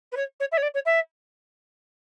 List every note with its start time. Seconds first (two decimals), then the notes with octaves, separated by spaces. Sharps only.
0.12 B4
0.16 C#5
0.40 C#5
0.51 E5
0.57 C#5
0.62 D5
0.74 C#5
0.85 E5